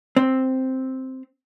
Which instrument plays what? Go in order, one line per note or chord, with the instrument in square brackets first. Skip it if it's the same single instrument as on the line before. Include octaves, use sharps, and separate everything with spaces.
[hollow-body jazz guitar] C4